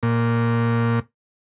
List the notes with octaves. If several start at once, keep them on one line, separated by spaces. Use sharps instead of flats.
A#2